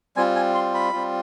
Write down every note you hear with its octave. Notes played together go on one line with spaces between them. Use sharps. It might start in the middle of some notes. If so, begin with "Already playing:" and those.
G3 C4 F4 G#5
G#5
C6
B5
G3 C4 F4